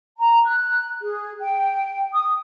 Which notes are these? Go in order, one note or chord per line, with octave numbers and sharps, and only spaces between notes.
A#5
F#6
G#4
G5
D#6